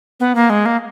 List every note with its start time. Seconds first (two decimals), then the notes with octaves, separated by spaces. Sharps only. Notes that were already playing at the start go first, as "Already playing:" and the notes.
0.20 B3
0.35 A#3
0.50 G#3
0.65 A#3